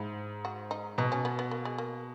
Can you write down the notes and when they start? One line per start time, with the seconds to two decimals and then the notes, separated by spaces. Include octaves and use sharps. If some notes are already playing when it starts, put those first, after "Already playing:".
Already playing: G#2 E4
0.45 F#4
0.71 D#4
0.98 B2 D#4
1.12 C#4
1.25 B3
1.39 B3
1.51 A#3
1.65 G#3
1.78 A#3